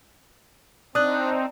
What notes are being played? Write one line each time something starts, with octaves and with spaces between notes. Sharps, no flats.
C4 D4 D#4 D#6 F#6